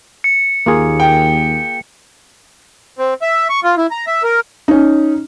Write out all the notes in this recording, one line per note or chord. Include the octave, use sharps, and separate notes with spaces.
C#7
D#2 A#3 F4 G#4
G5
C4
E5
C#6
F4
E4
A#5
E5
A#4
C#4 D#4